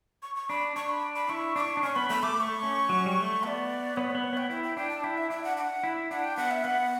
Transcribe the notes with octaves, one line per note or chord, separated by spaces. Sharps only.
C#6
C#6
D4 B5
D4 C#6
B5
B5
E4 C#6
D4 C#6 D6
D4
C#4 C#6
B3 B5
A3 B5
A3 D6
A3 C#6 D6
C#4
F#3
G3
A3
B3 D5 E5
B3 C#5
B3 B4
C#5
B3 G5
E4 G5
G5
D4 G5
A5
E4 G5
E5
D4 E5
F#5
F#5
E4
D4 F#5
G5
B3 F#5
E5
B3 F#5